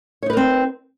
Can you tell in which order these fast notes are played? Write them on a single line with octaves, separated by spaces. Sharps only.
C#5 D#4 B4 A#4 C4